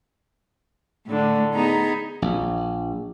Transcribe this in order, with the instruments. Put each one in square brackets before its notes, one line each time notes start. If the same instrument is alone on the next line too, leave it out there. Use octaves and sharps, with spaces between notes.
[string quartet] A2 D3
B3 D#4 G#4 A#5 B5
[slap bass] A#1